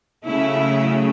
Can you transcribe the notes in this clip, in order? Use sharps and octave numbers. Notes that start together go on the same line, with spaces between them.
C#3 F#3 A3 C#4 E4